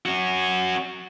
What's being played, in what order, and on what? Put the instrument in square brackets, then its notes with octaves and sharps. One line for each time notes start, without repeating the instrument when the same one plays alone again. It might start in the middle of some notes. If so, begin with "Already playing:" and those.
[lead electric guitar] C#4 F#4